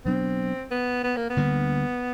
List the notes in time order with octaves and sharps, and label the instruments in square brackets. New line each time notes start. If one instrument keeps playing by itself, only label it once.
[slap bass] B2 F#3 B3 D4 [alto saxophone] C4
[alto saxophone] B3
B3
A#3
B3
[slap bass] D2 D3 G3 A#3